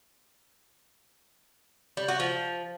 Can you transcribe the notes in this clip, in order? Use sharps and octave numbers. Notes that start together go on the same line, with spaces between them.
G3
F#4
F3